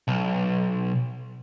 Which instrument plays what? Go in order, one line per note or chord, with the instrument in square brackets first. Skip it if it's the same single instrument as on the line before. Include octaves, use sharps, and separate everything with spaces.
[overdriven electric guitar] B1